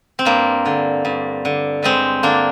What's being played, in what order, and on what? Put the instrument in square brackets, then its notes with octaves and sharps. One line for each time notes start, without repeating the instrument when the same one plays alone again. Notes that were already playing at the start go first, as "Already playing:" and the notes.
[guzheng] C4
G2 A#3
D3
G2
D3
G2 G#3 C4
D3 A#3 D4